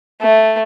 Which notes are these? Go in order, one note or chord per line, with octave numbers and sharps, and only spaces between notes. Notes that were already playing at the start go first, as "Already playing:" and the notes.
A3